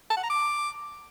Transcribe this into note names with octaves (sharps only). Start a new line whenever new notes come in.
A5
F#5
A#5
D6